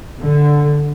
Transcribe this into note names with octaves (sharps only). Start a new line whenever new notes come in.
D3